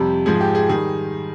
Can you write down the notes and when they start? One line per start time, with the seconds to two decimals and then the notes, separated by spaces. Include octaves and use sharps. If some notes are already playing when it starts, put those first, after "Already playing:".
Already playing: F2 C3 G3 G4
0.26 G#2 F3 G#4
0.40 G4
0.55 G#4
0.69 D#3 G3 G#4